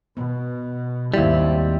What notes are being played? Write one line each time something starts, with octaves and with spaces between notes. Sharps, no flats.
B2 B3
G#1 D#2 G3 C4 E4 E5